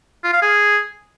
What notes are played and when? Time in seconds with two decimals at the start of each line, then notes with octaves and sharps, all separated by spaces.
0.24 F4
0.33 F5
0.42 G#4